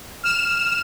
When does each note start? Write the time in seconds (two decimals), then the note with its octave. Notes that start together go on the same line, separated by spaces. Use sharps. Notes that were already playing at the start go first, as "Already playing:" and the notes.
0.23 F6 E7